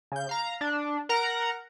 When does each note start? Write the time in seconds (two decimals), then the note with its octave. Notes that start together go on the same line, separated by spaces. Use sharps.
0.12 C#3 G6
0.29 F5 A#5
0.61 D4
1.09 A#4 F#5 A#5